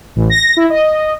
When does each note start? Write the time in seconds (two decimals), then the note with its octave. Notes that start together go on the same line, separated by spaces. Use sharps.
0.16 A1
0.30 A#6
0.57 E4
0.70 D#5